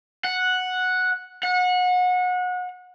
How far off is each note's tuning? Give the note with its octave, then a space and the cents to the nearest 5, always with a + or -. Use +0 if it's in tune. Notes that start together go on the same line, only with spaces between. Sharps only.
F#5 -5
F#5 -30